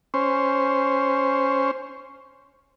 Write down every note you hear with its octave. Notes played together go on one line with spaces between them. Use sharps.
C#4 C5